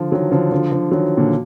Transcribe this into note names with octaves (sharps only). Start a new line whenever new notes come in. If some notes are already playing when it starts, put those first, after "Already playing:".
Already playing: D3 F3
D#3 F#3
D3 F3
D3 F3
D3 F3
D#3 F#3
A#2 D3